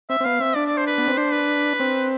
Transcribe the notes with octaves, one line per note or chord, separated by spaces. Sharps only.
C4 E5
C4
B3 F5
C4 E5
D4 D5
D5
C5
B4
B3
C4
D4 C5
B4
C4